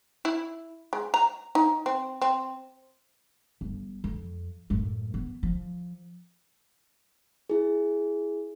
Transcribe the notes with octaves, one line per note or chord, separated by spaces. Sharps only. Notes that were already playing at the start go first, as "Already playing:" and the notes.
E4
G#3
A#5
D#4
C4
C4
G1
F2
F#2 A2
B3
F3
E4 G#4